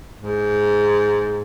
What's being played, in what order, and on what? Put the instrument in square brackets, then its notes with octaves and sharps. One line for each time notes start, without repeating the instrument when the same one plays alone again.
[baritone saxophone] G#2